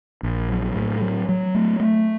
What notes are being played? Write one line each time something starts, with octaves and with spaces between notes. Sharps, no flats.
A#1
F#3
A2
F#3
F#3
A3
A3